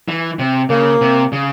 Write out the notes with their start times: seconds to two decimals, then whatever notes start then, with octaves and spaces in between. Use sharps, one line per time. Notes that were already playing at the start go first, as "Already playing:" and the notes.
0.08 E3
0.39 C3
0.70 C#3 A#3
1.02 C3
1.32 C#3